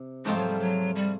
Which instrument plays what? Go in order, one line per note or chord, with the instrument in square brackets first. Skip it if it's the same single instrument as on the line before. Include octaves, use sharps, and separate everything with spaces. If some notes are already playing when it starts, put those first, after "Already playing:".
Already playing: [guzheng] C3
[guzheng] G#2 F3 A3 C4 F4 [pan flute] G#3
[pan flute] F#3
G3
F#3
G3